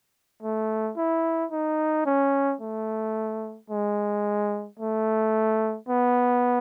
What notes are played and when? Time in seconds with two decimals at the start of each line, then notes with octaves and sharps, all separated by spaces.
0.42 A3
0.97 E4
1.52 D#4
2.06 C#4
2.61 A3
3.70 G#3
4.79 A3
5.89 B3